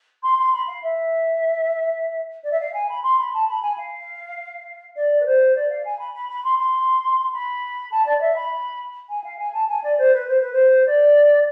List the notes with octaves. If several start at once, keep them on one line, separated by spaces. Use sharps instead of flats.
C6
C6
B5
F5
E5
D5
E5
F5
G#5
B5
C6
B5
A5
B5
G#5
F5
D5
B4
C5
D5
F5
G#5
B5
B5
B5
C6
C6
B5
A5
D5
D5
E5
B5
G#5
F5
G#5
A5
G#5
D5
C5
B4
C5
B4
C5
D5